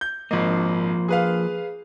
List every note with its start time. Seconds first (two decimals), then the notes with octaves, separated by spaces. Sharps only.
0.01 G6
0.31 G#1 F3 A#3 D#5
1.08 G#4 B4 F5